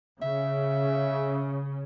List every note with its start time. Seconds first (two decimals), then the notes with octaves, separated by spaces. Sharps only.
0.22 C#3 E5